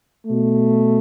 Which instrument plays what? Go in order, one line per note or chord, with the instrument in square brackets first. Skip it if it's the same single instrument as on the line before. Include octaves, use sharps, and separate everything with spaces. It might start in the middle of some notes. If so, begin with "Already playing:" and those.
[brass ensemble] B2 A3